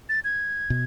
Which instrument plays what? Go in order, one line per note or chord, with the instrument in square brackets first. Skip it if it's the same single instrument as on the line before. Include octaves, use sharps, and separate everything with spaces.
[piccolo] A6
G#6
[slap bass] B2